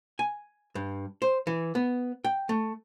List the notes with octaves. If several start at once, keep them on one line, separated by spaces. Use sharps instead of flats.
G#5
G2
C5
E3
B3
G5
A3